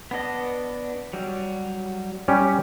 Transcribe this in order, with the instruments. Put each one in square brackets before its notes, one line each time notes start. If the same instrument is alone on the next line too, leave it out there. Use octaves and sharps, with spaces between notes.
[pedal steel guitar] B3 D4 D#5
F#3 G3
[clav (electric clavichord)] G3 C#4 G4